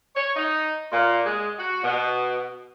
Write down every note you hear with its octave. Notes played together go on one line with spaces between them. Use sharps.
C#5
D#4
A#2
G#3
F#4
B2